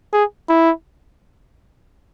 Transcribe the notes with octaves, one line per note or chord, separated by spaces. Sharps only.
G#4
E4